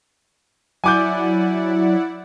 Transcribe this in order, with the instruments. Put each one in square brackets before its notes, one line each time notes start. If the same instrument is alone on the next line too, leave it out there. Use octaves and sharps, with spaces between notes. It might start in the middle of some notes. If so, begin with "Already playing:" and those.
[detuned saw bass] F#3 [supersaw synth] E4 D5 F#5 [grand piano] G#5 D6 G6